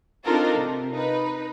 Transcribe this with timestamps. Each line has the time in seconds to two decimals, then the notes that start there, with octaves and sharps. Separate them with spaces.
0.25 C4 D4 D#4 F4 A4 A#4
0.58 C3
0.93 D#4 B4